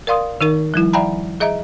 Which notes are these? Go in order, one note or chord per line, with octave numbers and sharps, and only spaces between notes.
A#4 D5 F5 C6 D#6
D#3 D#4 A#4
F3 G3 E4
D5 E5 F#5 G#5 A#5 B5
G#4 D#5 E5 A#5